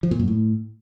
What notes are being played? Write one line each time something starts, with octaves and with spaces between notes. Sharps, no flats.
F3
A#2
F#2
A2